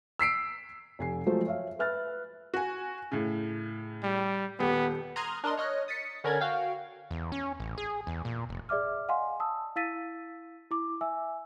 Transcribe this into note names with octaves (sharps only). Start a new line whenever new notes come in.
E6 B6 C7 D7
F1 G#5 C7
F3 F#3 G#3 A3 A4 C5
C#5 E5 F5
B4 E5 F6 F#6 A6
F#4 G#5
A2 C#3
G3
D#1 B3 G4
A#5 C6 D#6 F6 F#6 G#6
D4 A#4 D#5 C6
C#5 D#5 F6 F#6
D#6 A6 B6 C#7
D3 C#4 A#4 B5 G#6 A6
F#4 F5 G5
E2
C#4
A1
G#4
E2
A#2
F1
G#4 D5 E5 D6 F6
D#5 F5 F#5 G#5 C6
A5 D#6 E6
E4 F5 E6 A6 B6 D#7
E4 D6
E5 G#5 E6